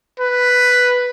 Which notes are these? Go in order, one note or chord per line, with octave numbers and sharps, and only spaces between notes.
B4